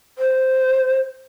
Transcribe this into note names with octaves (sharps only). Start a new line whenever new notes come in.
C5